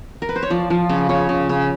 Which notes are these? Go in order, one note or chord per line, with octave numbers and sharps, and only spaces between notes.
A#4
B4
C5
C#5
F3 D5
F3
C#3
C#3 C#5
C#3
C#3